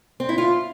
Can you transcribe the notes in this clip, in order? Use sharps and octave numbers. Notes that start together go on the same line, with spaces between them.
C4
E4
F4